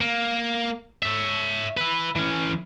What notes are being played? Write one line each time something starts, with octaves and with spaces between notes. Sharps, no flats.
A#3
C#5 E5
E4 B4
E3 C#4